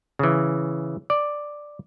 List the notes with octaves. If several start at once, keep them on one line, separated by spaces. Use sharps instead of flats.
C#3 E3
D5